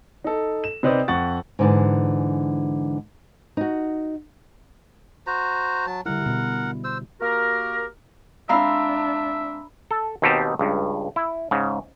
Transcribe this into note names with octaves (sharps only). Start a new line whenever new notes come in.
D#4 A4
E7
C3 D#4 B4 C5 D5 D#6
F2 F#5 C#6 A6
G#2 D3 E3
D#4 F#4
F#4 C5 A#5
F#3 A5
D3 G3 E4 A#4 F#5
B2 D3
C5 E6
A#3 F#4 G4 A#4
G#3 C4 D4 E5 F5 A#5 B5 E6
A4
D#2 B2 C4 D#4 G4 A5
C#2 G2
E4
G#2 C#3